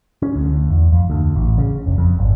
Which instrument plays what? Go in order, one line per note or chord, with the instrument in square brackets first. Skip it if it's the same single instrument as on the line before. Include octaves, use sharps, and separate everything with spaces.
[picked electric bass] C#4
D2
D2
E2
F2
D2
A1
C#3
F1
F2
G#1